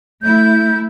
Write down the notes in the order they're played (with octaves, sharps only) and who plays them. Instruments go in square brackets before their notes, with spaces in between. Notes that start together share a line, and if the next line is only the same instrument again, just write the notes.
[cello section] A3 E4 [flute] G6